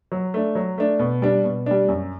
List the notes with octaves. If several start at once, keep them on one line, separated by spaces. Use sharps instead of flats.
F#3
A3 D4
F#3
A3 D4
B2
G3 D4
B2
G3 D4
F#2